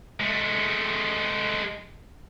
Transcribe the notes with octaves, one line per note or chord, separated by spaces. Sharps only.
G#3 A3